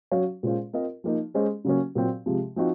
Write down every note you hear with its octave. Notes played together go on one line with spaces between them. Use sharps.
F#3 C#4 F#4 C#5 F5
A#2 G#3 C#4 F4 C5
C4 F4 A#4 D#5
F3 A#3 D#4
G#3 C#4 G#4 C5 D#5
C#3 F#3 A#3 C#4
A#2 F#3 C4
C3 F3 G#3
F3 C4 D#4 F#4